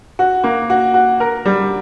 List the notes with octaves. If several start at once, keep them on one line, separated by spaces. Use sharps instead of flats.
F#4
A#3
F#4
F#4
A#4
G3